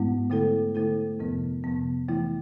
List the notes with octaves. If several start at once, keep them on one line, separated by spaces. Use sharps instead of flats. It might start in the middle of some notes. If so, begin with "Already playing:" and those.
Already playing: G#2 G#3 B3 E4
D3 A3 E4 A4
D3 A3 E4 A4
F2 C3 F3 B3
F2 C3 F3 B3
E3 A3 E4